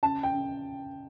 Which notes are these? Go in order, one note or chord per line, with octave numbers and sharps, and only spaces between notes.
C#3 A5
G5
C#3